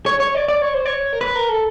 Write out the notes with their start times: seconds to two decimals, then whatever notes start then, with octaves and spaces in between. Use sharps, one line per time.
0.06 C#5
0.20 C#5
0.35 D5
0.48 D5
0.62 C#5
0.74 C5
0.86 C#5
1.13 A#4
1.21 B4
1.35 A#4
1.49 A4